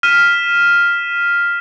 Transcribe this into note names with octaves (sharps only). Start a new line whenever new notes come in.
F6 B6 D#7 E7